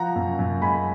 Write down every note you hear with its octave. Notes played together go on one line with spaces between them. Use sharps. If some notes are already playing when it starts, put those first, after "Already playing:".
Already playing: F3 F#5 A#5
F#2
F#2
G#3 G#5 B5